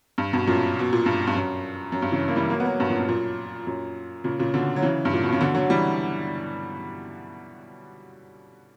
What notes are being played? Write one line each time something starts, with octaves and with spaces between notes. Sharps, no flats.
G2
G2 B2
F#2 A#2
B2
A#2
G2
G2
F#2
F#2
G2
C#3 E3
A#3
E3 G3
F#3 A#3
B3
F#3 A#3
G2 B2
F#2 A#2
G2
F#2 A#2
F#2 A#2
A#2 C#3
A#2 C#3
B2 D3
F#3
C#3 E3
G2
A#2
B2
C#3
B2 D3
D3 F#3
E3 G3